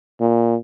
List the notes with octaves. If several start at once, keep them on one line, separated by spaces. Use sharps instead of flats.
A#2